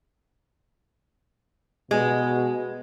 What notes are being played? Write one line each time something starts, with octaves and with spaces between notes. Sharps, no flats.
B2 G#3